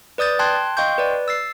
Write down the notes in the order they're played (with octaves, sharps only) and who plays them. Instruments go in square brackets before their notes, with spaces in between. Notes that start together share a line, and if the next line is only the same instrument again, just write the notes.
[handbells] B4 D5 D#6 G6 A6
G5 A5 C6 F#6 G#6
D#5 F5 G5 C6 C#6 G6
B4 D5
E6 A6 C7